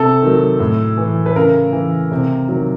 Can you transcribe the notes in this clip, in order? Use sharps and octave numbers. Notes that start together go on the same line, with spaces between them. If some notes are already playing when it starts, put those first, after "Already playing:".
Already playing: C3 A4
D#3 F#3
A2
E3
B4
C#3 A#4
E3
C3
D#3 F#3